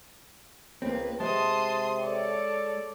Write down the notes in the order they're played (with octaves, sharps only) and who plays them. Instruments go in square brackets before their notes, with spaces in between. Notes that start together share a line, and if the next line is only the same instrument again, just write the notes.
[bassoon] C#2 [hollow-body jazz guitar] A#3 C4 [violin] B4
[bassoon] C3 [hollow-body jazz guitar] G#3 [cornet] A5 [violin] C6 D#6
[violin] A4 C#5 [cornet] D5